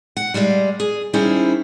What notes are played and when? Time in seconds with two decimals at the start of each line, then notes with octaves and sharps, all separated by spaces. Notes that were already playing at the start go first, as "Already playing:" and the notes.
0.17 F#5
0.34 G3 G#3 D5 E5 F5
0.80 G#4
1.13 D#3 G3 C#4 E4 G#4 C5